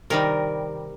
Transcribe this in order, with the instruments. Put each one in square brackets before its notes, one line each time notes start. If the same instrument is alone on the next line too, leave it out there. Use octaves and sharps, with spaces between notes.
[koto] C3 D#3 G3 A#4